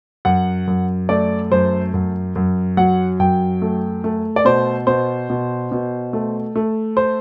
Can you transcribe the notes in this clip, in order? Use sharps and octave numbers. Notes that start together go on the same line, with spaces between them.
F#2 F#5
F#2
A3 D5
F#2 C5
F#2
F#2
F#3 F#5
F#2 G5
A3
A3
D5
B2 C5
B2 C5
B2
B2
A3
A3
C5